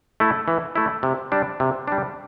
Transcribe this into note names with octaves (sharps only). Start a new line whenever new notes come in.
A3 E4
E3
A3 E4
C3
G3 D4
C3
G3 D4